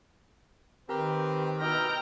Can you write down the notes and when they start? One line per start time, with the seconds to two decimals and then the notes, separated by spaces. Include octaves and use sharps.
0.89 D#3 C4 G4 A#4 B4
1.61 B2 D#4 E4 G5 A#5 F6